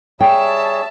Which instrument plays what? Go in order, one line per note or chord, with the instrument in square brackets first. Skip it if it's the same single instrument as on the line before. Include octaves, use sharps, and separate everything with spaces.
[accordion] G3 G#4 C#5 [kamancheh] E5 A5 [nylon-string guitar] G5